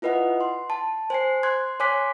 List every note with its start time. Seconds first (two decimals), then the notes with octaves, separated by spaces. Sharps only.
0.02 E4 F4 B4 D#5 F#5
0.41 C6
0.70 A5
1.10 C5 G#5 C7
1.43 C6 F#6 G#6
1.80 C#5 G#5 C6 D6 F#6 B6